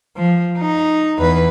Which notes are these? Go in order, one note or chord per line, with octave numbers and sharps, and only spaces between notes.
F3
D#4
E2 B4